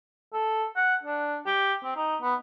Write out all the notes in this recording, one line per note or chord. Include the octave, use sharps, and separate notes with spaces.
A4
F#5
D4
G4
C4
D#4
B3